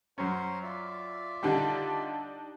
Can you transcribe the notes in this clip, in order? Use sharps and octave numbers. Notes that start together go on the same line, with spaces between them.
F#2 C#4 C5 A#5 C6
F4 D5 E5
D3 G3 D4 D#4 G4